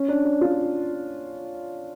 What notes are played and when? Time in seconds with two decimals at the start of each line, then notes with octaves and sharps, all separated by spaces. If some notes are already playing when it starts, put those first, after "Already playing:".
Already playing: C#4
0.08 D4
0.25 D4
0.41 F4